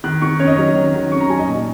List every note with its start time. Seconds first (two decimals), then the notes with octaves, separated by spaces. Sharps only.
0.04 D#3 F#6
0.22 D#3 C#6
0.40 C#4 C#5
0.47 D#5
0.56 F#3 C#5
0.76 D#3
0.94 D#3
1.12 C#4 C#6
1.20 A#5
1.29 F#3 G#5
1.39 D#5
1.48 A#2